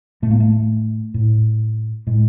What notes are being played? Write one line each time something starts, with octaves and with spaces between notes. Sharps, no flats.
A2 A3
A#3
A3
A2
A2 G#3